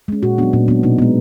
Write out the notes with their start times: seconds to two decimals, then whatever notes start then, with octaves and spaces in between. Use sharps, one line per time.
0.08 G#3 C#4
0.23 A#2 F#4
0.38 F#3 B3 D4
0.53 A#2 C#4
0.68 F#3 B3 D4
0.83 B2 D#4
0.98 G#3 B3